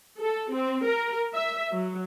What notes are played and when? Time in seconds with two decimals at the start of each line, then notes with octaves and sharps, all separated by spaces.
0.20 A4
0.52 C4
0.86 A#4
1.33 E5
1.71 F#3